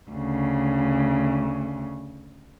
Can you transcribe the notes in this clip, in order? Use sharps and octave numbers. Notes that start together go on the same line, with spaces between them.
D2 C#3